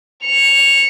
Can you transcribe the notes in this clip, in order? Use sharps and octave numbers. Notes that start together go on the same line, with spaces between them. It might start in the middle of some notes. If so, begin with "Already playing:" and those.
C#7 F7